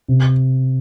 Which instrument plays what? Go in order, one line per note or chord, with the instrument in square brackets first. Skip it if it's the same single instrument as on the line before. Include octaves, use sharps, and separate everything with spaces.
[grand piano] C3